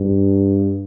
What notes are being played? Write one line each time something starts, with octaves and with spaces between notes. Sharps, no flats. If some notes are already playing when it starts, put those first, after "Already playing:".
Already playing: G2